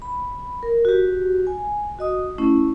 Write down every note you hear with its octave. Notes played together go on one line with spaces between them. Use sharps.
B5
A#4
F#4 G4
G#5
F#4 D#5 D#6
A3 C#4 E4